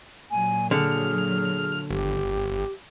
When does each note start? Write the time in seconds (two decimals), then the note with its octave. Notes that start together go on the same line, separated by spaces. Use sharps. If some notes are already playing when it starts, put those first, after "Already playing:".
0.31 A#2 F#3 G#5
0.71 D3 G#4 F6
1.90 G1 G4